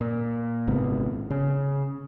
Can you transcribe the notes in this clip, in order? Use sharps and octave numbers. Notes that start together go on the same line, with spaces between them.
A#2
G#1 G#2 C3 B3
C#3